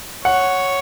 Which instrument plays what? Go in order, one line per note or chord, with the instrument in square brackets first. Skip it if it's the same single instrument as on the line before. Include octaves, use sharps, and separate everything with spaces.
[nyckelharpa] C#5 [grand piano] F#5